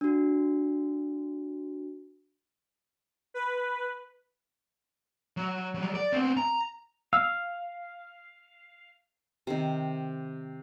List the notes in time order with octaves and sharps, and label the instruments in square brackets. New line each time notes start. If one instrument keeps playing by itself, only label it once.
[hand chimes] D4 F#4
[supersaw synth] B4
[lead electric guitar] F#3
F#3 G3
D5
B3 C4
A#5
[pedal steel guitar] F5 [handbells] E6
[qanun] C3 D#3